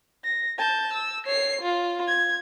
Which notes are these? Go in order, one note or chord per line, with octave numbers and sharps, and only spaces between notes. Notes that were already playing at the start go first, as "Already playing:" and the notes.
A#6
A5 G6
E6
C#5 C7
F4
G#6